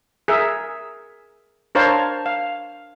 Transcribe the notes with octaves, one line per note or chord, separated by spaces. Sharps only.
G#4 A#4 E5
D4 A#4 C5 C#5 F5 A5
F5